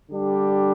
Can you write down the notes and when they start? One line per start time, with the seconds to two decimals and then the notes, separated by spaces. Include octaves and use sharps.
0.11 D3 G3 D4 G4